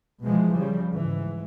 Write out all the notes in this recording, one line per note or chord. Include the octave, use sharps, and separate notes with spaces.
B2 E3 F3 G#3
C#3 F3 G3
G#2 E3